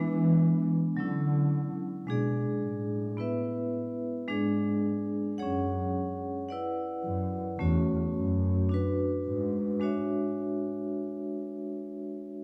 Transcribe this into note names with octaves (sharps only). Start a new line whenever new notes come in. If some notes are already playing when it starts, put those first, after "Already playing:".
Already playing: E3 G#3 B3 D4
D3 F#3 C#4 E4
B2 G#3 D4 G#4 D5
A2
B3 E4 B4 E5
G#2 G#3 D4 G#4 D5
F#2 C#4 G#4 C#5 F#5
E4 B4 D5 F#5
F#2
E2 A3 C#4 F#4 C#5
F#2
D4 F#4 B4
G#2
G#3 D4 F#4 C#5 E5